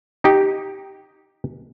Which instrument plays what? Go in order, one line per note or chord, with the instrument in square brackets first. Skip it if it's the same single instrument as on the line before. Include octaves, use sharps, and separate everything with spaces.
[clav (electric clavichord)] D#4 G4